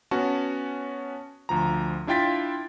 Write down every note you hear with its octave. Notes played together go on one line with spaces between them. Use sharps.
B3 C#4 F#4 A5
D2 F3 A#5
D4 E4 F4 G5 A6 B6